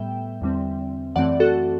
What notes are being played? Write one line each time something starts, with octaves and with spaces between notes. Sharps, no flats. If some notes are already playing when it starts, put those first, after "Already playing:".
Already playing: A2 G3 B3 E5 G5
E2 D3 G3 C4
F#2 E3 A3 C4 D5 F#5
F#4 A4